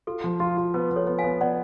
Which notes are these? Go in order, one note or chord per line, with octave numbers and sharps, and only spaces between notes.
F4 A4
F3
F4
F4
B3 B4
B3
A4 C#5
B3
F5 G#5
B3
B3 D5 F#5